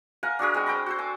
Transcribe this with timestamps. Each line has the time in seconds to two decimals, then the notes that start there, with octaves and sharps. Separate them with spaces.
0.23 A#4 F5 F#5 G#5
0.39 D4 F#4 G#4 A#4
0.54 G#3 C4 F#4
0.66 C4 G5 A#5 B5
0.86 F#4 A4 C5
0.98 G#5 D6